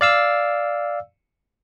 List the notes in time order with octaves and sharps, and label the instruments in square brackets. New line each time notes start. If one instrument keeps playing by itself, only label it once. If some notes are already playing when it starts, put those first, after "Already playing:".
[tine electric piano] D5 F5 E6